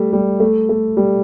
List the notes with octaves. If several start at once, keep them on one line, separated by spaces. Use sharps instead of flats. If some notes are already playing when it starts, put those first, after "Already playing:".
Already playing: G3 A3
G3
A3
A3
G3